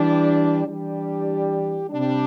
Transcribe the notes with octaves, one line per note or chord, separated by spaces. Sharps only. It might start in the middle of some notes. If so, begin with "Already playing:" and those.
Already playing: E3 G3 D4 G4
E3 G3 D4 G4
C3 G3 D4